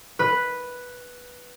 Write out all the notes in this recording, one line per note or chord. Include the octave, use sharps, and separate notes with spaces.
B4